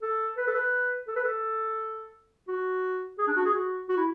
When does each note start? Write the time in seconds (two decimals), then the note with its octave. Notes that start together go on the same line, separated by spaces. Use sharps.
0.02 A4
0.37 B4
0.47 A4
0.55 B4
1.07 A4
1.16 B4
1.24 A4
2.48 F#4
3.18 G#4
3.28 D4
3.36 F#4
3.45 G#4
3.54 F#4
3.89 F#4
3.97 E4